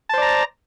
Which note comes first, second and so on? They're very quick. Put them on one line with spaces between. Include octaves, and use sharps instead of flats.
A5 C5 D5 A#5